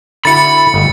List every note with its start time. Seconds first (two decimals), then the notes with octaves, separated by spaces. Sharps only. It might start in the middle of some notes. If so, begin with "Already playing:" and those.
0.25 D3 E4 F#4 B5 A6 C#7
0.74 G1 A3 D#5